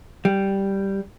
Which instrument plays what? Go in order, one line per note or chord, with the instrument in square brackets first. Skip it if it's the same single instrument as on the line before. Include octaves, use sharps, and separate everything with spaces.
[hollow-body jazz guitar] G3